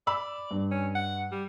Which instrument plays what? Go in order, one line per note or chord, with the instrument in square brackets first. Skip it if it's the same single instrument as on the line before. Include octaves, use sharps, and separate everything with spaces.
[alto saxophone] D5 [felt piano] B5 E6
[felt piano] G2
[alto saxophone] C#4
F#5
G3